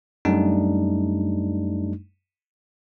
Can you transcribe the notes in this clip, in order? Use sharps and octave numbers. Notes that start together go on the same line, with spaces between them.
F#2 G3 A3 D4 D#4